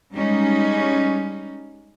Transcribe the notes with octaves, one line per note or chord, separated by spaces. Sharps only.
G3 G#3 C#4 D#4